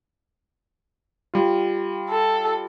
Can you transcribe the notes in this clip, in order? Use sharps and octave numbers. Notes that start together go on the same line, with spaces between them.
G3 F4
A4